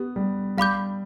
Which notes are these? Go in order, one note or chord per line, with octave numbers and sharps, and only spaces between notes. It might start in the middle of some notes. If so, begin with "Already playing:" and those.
Already playing: B3 G4
G3
G3 F5 B5 D6 G6